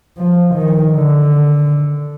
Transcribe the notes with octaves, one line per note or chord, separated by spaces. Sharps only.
F3
D#3
D3